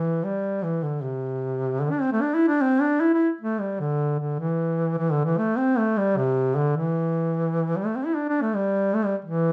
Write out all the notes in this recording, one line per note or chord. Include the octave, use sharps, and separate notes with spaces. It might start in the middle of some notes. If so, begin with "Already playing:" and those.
Already playing: E3
G3
E3
D3
C3
D3
D4
C4
A3
D4
E4
D4
C4
D4
E4
E4
A3
G3
D3
D3
E3
E3
D3
E3
A3
C4
A3
G3
C3
D3
E3
G3
A3
C4
E4
D4
D4
A3
G3
A3
G3
E3